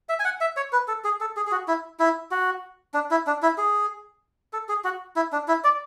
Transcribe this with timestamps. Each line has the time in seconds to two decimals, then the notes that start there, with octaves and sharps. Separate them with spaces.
0.09 E5
0.19 G#5
0.24 F#5
0.41 E5
0.57 C#5
0.72 B4
0.88 A4
1.04 G#4
1.21 A4
1.37 G#4
1.47 G#4
1.52 F#4
1.68 E4
1.99 E4
2.31 F#4
2.94 D4
3.11 E4
3.27 D4
3.42 E4
3.58 G#4
4.53 A4
4.69 G#4
4.84 F#4
5.16 E4
5.32 D4
5.48 E4
5.64 D5